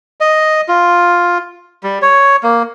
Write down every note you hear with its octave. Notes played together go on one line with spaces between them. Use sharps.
D#5
F4
G3
C#5
A#3